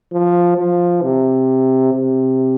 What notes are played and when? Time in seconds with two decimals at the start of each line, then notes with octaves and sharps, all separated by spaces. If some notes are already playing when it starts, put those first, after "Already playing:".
0.12 F3
0.58 F3
1.03 C3
1.94 C3